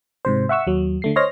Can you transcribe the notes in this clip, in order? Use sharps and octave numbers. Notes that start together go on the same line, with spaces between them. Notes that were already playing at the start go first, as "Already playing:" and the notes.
G#2 C3 C5
E5 F#5 C#6 E6
D#2 F#3
D3 A3 C7
C5 C#5 D#5 C6 F6 A#6